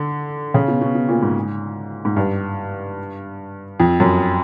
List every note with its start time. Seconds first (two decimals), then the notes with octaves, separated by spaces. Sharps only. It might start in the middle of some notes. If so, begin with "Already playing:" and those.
Already playing: D3
0.54 C#3
0.68 B2
0.81 B2
0.95 B2
1.09 A#2
1.22 G#2
2.05 G#2
2.17 G2
3.80 F2
4.00 F#2